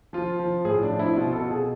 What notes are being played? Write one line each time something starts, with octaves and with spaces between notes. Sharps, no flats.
F3 F4
F3
A2 G#4
D4
F3
E4
B2 F4
A4
B2
G#4